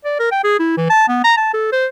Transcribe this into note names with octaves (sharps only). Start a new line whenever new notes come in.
D5
A#4
G5
G#4
E4
E3
A5
B3
A#5
A5
A4
C5